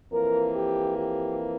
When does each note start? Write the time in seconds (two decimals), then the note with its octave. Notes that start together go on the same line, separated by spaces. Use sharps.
0.10 F2 E3 A#3 A#4
0.54 G4
0.97 G4